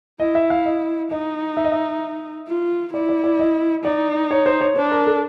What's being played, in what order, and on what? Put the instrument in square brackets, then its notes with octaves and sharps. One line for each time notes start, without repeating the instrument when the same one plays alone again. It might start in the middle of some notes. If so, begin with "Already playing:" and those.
[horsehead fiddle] E4 [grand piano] D#5
[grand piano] E5
F5
D#5
[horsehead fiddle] D#4 [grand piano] D#5
[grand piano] E5
D#5
E5
[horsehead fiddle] F4
[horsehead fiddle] E4 [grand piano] D5
[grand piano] D5
D5
D#5
[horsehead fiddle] D#4 [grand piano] D5
[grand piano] C#5
C5
C#5
[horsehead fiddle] D4 [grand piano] C5
[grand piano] A#4
A4